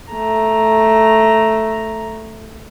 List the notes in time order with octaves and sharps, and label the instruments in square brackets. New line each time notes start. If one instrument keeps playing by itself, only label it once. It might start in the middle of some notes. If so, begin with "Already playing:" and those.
[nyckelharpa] A3 A#5